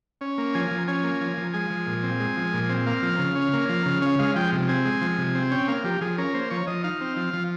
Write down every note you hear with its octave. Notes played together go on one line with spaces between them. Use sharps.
C#4
A#3
F3 G#5
F3
C#4 G#5
A#3
F3
F3
G#3 G#5
F3
A#2
C4
G#3
F3
A#2
C4
A#3 F5
F3
C#3
C#4
A#3
F3
C#3
C#4
G#3 F5
F3 G5
C3
C4 G#5
G#3
F3
C3
C4
C#4 G5
A#3 F5
F3 G4
F3 G#4
C#4 A#4
A#3 C5
F3 C#5
F3 D#5
D#4 F5
C4
F3
F3